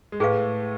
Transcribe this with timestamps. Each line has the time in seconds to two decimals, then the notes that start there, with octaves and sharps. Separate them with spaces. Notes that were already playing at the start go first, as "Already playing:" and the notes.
0.12 G#3
0.20 A2 A3 G#4 B4 F5